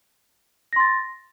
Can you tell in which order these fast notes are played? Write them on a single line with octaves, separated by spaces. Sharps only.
A#6 C6 A6